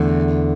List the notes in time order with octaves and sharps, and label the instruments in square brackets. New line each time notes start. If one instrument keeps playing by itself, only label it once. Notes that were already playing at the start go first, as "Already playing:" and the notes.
Already playing: [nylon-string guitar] E2 D3 A3